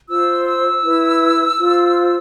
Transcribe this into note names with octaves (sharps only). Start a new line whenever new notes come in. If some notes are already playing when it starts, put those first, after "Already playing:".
F4 C5 E6
E6
E4 B4
F4 C5